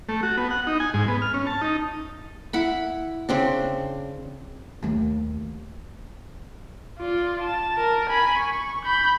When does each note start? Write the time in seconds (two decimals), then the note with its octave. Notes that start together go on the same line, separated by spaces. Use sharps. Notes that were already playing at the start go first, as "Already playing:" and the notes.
0.09 A3
0.23 F#4
0.37 B3
0.51 F#5
0.67 D#4
0.80 G#5
0.94 G#2
1.08 B3
1.22 F6
1.34 C#4
1.47 A5
1.61 D#4
2.53 E4 F#5 B5
3.29 C#3 C4 D4
4.82 D#2 A3
6.99 F4 D5
7.42 A5
7.77 A#4
8.10 G#5 B5
8.39 C#6
8.86 B5 G6